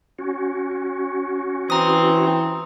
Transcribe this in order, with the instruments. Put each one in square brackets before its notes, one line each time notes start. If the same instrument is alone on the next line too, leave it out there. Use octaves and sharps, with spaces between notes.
[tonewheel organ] C#4 F#4
[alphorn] E3 [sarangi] C4 [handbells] A#5 D#6